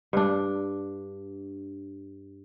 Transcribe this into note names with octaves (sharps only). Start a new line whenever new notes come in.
G2 D4